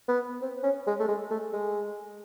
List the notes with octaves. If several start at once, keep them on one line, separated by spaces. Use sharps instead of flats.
B3
C4
C#4
G#3
A3
G#3
A3
G#3